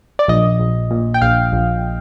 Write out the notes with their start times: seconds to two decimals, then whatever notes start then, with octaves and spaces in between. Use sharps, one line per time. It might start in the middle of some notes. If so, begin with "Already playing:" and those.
0.19 D5
0.28 A#1 D#5
0.60 A#1
0.91 A#2
1.14 G5
1.21 A#1 F5
1.52 A#1